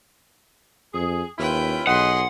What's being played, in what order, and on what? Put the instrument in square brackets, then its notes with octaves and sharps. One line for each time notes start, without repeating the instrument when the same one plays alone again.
[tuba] F2 [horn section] G#4
[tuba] D#2 [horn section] C#4 E4 F4 [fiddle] B4 G5
[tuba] B1 [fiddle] G#4 C6 [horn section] B4 D#5 [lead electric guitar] F#5